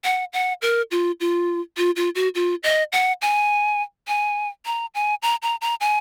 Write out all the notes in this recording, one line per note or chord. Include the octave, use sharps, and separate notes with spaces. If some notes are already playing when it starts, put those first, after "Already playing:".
F#5
F#5
A#4
F4
F4
F4
F4
F#4
F4
D#5
F#5
G#5
G#5
A#5
G#5
A#5
A#5
A#5
G#5